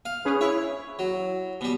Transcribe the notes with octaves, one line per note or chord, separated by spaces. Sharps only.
F5
C#4 G#4 B4
E4 C#5
F#3
B2 G3